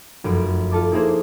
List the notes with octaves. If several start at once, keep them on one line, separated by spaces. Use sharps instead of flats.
F1 F#2 D7
F4 A4 A5 D6
A#3 D#4 E4 G#4 A#4 C5